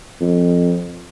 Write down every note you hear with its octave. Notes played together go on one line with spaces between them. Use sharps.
F2